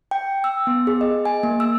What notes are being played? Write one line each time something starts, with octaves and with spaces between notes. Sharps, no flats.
G5
E6
B3
G#4
D#5
G#5
A#3
E6